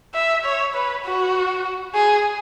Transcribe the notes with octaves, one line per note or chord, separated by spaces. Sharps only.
E5
C#5
B4
F#4
G#4